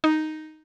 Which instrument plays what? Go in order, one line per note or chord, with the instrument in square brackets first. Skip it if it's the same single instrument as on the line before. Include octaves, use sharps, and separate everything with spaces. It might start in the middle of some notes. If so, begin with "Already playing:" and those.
[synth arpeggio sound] D#4